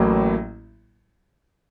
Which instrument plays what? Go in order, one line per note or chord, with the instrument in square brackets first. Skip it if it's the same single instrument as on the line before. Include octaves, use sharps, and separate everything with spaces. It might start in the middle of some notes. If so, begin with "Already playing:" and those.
Already playing: [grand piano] A1 A2 F#3 A#3